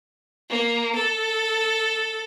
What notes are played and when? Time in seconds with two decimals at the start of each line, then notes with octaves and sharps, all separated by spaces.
0.50 A#3
0.95 A4